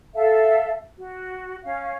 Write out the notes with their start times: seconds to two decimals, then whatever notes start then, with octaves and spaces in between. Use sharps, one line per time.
0.14 A4 E5 F5
0.98 F#4
1.64 C#4 F5